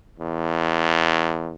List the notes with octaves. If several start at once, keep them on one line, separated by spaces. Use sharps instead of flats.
E2